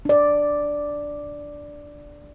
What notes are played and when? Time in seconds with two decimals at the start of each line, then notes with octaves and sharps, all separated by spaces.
0.05 D4 D5